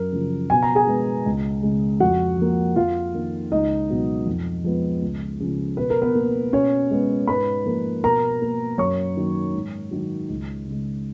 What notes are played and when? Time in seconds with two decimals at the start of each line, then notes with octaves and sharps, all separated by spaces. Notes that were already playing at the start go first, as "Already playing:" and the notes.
Already playing: F#2 A#4
0.12 C#3 F3
0.50 B2 G#5
0.63 A#5
0.75 G#4 G#5
0.87 G#3 B3
1.25 C#2
1.63 C#3 G#3
2.00 F2 F#4 F#5
2.39 F3 A#3
2.76 F2 F4 F5
3.14 D#3 A#3
3.51 C#2 D#4 D#5
3.89 B2 F#3 B3
4.26 F2
4.64 F3 G#3 B3
5.02 C#2
5.40 C#3 F3
5.77 B2 B4
5.90 A#4
6.02 B3 B4
6.15 A#3
6.52 B2 C#4 C#5
6.91 G#3 B3
7.27 G#2 B4 B5
7.65 F3 A#3
8.04 B2 A#4 A#5
8.42 A#3
8.78 F#2 C#5 C#6
9.17 D#3 F#3 A#3
9.53 G#2
9.91 D#3 F#3
10.29 C#2
10.67 C#3 G#3